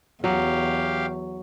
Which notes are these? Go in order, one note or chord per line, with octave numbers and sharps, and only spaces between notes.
E2 F#3 G4 F5